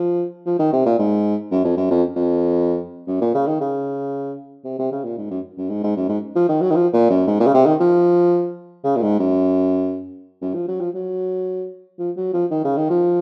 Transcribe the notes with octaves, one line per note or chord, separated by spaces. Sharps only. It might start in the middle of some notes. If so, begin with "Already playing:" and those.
Already playing: F3
F3
D#3
C3
A#2
G#2
F#2
F2
F#2
F2
F2
F#2
A#2
C#3
D#3
C#3
C3
C3
C#3
A#2
G#2
F#2
F#2
G#2
G#2
F#2
G#2
F3
D#3
F#3
D#3
F3
A#2
F#2
G#2
A#2
C#3
C3
D#3
F3
C#3
A#2
G#2
F#2
F#2
F3
F#3
F3
F#3
F3
F#3
F3
D#3
C#3
D#3
F3